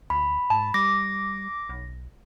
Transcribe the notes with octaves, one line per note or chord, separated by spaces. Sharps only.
D2 B5
G#2 A5
G3 D6 A#6
B1